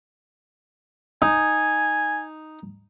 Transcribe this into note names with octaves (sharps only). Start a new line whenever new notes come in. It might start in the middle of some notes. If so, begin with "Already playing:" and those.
D#4 G#5